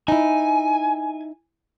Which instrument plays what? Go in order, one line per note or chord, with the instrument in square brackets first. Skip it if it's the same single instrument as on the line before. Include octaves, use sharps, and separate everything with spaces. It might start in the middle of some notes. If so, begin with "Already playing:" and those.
[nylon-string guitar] D#4 E4 [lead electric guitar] G#5